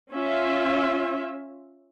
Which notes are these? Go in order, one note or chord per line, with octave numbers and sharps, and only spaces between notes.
C#4 F4 E5